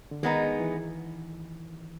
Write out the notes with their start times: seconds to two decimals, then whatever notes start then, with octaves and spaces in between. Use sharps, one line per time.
0.11 D3
0.23 D#3 G#3 B3 D#4
0.60 E3